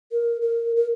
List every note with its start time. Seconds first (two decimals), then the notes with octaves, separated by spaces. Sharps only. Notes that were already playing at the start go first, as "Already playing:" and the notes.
0.12 A#4
0.42 A#4
0.76 A#4